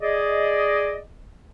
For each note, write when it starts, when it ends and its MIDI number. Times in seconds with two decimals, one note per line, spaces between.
0.02 0.98 68
0.02 0.98 74
0.02 0.98 75